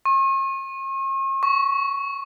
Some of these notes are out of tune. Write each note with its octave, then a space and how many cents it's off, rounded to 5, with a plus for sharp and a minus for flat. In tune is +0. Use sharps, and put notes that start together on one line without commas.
C#6 -45
C#6 +5